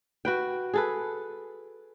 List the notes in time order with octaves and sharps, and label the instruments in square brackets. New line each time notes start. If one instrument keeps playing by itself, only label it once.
[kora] F#4 B4 G5
G#4 A4 B4